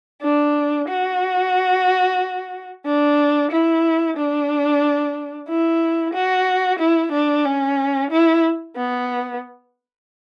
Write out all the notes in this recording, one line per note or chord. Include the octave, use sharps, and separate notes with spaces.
D4
F#4
D4
E4
D4
E4
F#4
E4
D4
C#4
E4
B3